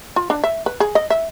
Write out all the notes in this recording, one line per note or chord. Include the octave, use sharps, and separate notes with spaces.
F4
D4
E5
B4
G#4
D#5
E5